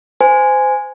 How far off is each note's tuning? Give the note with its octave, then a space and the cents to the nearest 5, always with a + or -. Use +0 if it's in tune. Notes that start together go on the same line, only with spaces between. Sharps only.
C5 -25 G#5 +0